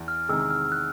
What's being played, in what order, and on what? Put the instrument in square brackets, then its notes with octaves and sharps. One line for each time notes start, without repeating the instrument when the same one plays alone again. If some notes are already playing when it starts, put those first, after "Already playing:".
Already playing: [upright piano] E2
[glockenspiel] F6
[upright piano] C3 D#3 G#3 [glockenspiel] E6
[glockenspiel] F6
F#6